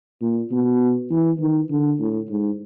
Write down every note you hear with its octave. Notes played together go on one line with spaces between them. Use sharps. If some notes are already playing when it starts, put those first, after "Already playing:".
A#2
B2
E3
D#3
D3
A2
G#2